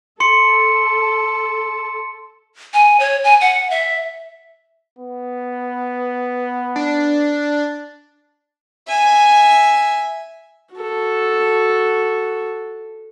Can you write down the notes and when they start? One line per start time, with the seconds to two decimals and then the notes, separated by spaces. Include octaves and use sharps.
0.20 A4 C6 C#7
2.74 G#5
3.00 C#5
3.24 G#5
3.41 F#5
3.70 E5
4.98 B3
6.76 D4
8.87 E5 G#5
10.75 F#4 A4